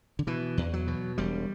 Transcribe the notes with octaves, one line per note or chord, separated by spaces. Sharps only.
D3
B2 E3
E2
F#3
B2
E1 G3